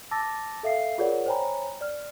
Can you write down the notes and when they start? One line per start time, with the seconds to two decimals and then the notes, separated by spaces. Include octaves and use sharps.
0.11 A5 D6 E6 A6 A#6
0.63 A4 E5 F5 C7
0.98 F4 G#4 A#4 C#5 D5 F#5
1.26 C5 C#5 G5 G#5 A#5 B5
1.81 D5 F6